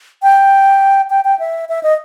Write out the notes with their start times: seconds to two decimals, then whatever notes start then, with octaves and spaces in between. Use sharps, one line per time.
0.22 G5
1.10 G5
1.25 G5
1.39 E5
1.69 E5
1.83 D#5